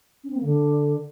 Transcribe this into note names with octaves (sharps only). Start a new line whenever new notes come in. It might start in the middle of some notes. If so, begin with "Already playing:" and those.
C#4
C4
A#3
D3